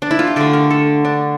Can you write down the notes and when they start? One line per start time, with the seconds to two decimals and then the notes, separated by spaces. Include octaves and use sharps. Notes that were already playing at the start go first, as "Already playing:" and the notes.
0.02 D4
0.11 E4
0.19 F4
0.27 G4
0.36 D3 A3 A4
0.53 A#4
0.71 A4
1.05 D4